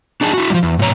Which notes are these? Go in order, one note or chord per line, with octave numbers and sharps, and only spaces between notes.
D4 D#4 G#4 A5
E4 F#4
F3 G3
E2
G#2 B2 C#5 A#5